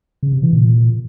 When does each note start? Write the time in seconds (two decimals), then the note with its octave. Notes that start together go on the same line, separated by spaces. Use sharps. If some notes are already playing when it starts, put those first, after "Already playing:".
0.23 C#3
0.33 C3
0.43 E3
0.53 A#2